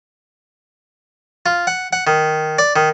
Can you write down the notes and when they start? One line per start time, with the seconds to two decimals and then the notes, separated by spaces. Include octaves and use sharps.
1.46 F4
1.67 F#5
1.93 F#5
2.07 D#3
2.58 D5
2.76 D#3